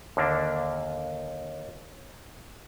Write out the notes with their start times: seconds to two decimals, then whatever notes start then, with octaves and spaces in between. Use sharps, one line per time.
0.17 D#2 D3 A#3 D4